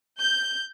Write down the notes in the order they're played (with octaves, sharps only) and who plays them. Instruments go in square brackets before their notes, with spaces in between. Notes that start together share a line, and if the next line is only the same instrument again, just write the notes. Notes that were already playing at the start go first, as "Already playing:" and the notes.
[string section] G6